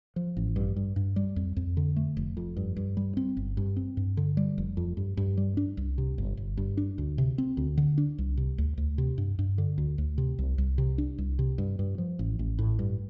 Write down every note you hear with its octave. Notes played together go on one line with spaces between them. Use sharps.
F3
A1
G2
G2
G2
G3
F2
F2
D3
A3
F1
F2
G2
G2
G3
C4
G1
G2
C4
G2
D3
G3
F1
F2
G2
G2
G3
D4
C2
C3
G1
G1
G2
D4
D2
C3
C4
D2
D3
D4
C2
C3
D2
D2
C3
G2
G2
D3
D2
D2
C3
C2
C2
C3
D4
C2
C3
G2
G2
F3
A1
A1
A2
G2